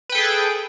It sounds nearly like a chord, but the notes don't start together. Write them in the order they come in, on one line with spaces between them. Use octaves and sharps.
B4 G5 A4 G#4